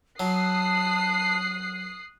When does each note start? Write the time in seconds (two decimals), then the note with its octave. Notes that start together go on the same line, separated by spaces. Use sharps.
0.20 F#3 A5 D#6 F#6 C7